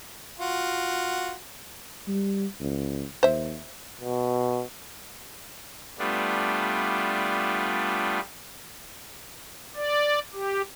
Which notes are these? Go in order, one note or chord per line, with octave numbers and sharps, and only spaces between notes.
F4 F#4
G3
C#2
D#2 C5 E5
B2
G3 A3 B3 D4 F4
D5
G4